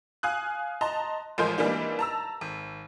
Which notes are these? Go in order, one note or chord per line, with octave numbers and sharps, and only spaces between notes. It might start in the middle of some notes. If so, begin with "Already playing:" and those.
F5 G#5 D#6 F#6
D#5 A5 A#5 C6
A1 F3 G#3 A#4 C6 G6
E3 G3 G#3 A#3 D4 D#4
A5 A#5 E6
G#1